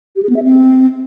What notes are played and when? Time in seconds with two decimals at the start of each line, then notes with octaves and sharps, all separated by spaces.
0.16 G4
0.23 G#4
0.29 B3
0.36 E5
0.43 C4